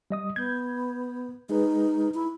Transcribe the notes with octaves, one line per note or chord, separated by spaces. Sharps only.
G3 D#5 D#6
B3 G6 G#6
G#3 D#4 G#4 B4
E4